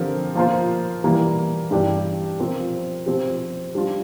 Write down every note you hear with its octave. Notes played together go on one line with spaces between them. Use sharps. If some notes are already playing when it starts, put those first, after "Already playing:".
Already playing: D3 F3 C4 G4 A#4
F3 A#3 F4 C5
E3 G3 A#3 E4
G2 E3 G3 D4 G4
F3 C4 F4 A#4
F3 C4 G4
G3 D4 F4